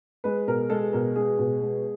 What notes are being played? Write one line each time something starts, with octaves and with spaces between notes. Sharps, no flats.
G#3 B4
B2 A#4
G#3 A4
B2 A#4
G#3 G#4
B2
G#3